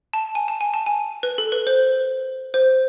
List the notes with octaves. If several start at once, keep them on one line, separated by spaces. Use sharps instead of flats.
A5
G#5
A5
G#5
A5
G#5
B4
A4
B4
C5
C5